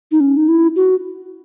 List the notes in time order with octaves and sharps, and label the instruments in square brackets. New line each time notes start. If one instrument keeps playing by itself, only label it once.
[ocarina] D#4
C#4
D#4
E4
F#4